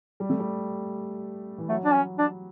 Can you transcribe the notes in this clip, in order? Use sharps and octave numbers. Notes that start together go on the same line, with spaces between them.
G3
A3
G3
E3
F#3 A3
D4
C#4
D4